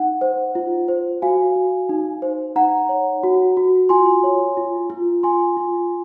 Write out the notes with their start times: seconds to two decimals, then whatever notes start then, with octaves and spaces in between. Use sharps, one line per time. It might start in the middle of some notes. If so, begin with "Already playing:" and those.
Already playing: D#4 F#5
0.21 C5
0.55 F4
0.88 C5
1.22 F#4 F5 G#5
1.56 F#4
1.89 D#4
2.22 C5
2.56 D#4 F#5 A#5
2.89 C#5
3.23 F#4
3.57 F#4
3.89 F4 G#5 C6
4.24 C#5
4.57 F4
4.90 F4
5.23 F4 G#5 C6
5.57 F4